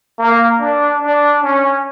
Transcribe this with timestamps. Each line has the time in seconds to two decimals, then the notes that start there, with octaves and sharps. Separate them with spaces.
0.18 A#3
0.59 D4
1.01 D4
1.42 C#4